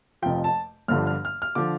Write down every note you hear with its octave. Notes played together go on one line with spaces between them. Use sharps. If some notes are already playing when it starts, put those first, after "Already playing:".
F1 F2 F3 G5
A5
G1 G2 D3 F3 F6
F6
F6
F6
D3 F3 D6